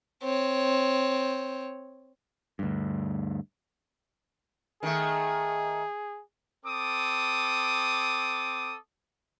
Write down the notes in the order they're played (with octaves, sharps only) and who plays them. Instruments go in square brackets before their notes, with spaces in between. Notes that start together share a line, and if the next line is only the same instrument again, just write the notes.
[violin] C4 C#5
[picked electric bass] D2 G2
[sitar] D#3 A3 [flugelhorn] G#4
[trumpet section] C4 A4 D6 D#6